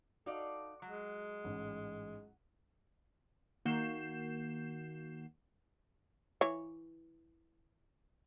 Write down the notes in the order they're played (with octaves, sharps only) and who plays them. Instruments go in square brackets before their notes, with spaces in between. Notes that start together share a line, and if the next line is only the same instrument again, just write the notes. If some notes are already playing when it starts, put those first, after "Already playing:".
[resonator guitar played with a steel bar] D#4 D5 F5 [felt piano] F#4 [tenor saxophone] A4
[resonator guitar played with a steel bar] F#3 [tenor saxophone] G#3
[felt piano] A1 G#2
[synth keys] D#3 A#3 F#4 G6 C7 E7
[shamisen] E3 C#5